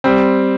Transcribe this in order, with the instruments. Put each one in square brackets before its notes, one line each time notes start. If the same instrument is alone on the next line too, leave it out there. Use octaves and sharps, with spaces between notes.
[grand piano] G3 C4